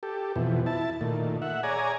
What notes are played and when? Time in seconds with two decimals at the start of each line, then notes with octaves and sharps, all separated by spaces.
0.03 G4 A4
0.36 F2 B2 E3
0.66 E4 A5
1.01 A#2 D#3 A3
1.42 E5 F#5
1.63 G#4 C#5 D5 G#5 A#5